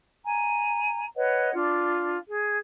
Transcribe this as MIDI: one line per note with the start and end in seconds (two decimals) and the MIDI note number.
0.24 1.04 80
0.24 1.04 82
1.15 1.52 71
1.15 1.52 73
1.15 1.52 75
1.15 1.52 78
1.53 2.18 62
1.53 2.18 65
2.29 2.58 68